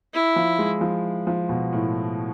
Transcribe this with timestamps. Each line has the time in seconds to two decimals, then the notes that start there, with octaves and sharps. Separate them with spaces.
0.14 E4
0.36 F3
0.59 G#3
0.81 F3
1.27 F3
1.49 B2
1.72 A2